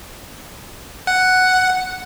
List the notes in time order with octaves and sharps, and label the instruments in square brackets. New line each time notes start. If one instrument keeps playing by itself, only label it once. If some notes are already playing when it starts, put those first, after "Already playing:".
[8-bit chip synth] F#5